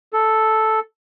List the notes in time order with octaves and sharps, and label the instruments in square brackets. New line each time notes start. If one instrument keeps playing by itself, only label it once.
[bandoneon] A4